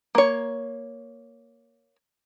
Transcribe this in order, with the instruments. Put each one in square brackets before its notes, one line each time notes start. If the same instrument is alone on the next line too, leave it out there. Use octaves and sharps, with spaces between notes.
[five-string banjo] A#3 C#5